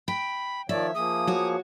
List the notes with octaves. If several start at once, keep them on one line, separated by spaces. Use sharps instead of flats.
G5 B5
D#3 F3 C#5 D5 E5
F3 A#3 G#4 D#6
F#4 C#5